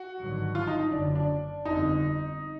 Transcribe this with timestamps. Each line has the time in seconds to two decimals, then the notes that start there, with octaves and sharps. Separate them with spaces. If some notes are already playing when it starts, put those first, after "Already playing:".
Already playing: F#4
0.18 G#1 G2 D3 F#3
0.55 F4
0.67 D#4
0.79 D#4
0.92 F#1 F#2 D3 F#3 D4
1.15 D4
1.65 G1 F2 D3 D#4